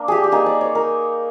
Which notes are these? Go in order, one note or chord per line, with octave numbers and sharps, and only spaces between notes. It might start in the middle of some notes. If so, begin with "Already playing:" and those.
Already playing: A#3 D4
G4 G#4
G4
A#3 D#4 G#4
D5
C#5
A#4